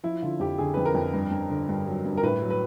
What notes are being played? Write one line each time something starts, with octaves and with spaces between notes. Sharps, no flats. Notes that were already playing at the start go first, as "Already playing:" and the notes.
F3 E4
D3 F4
F2 G4
D3 G#4
F2 B4
A#4
F2
G2
G2
D3
G2
F#3
G2
A#4
A2 B4
F#3
B4